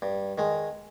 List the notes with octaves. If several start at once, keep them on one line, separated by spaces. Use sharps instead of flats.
G2
D#3 G#3